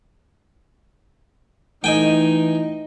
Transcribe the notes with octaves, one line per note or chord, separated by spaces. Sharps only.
E3 A3 D#4 D#5 G5 G#5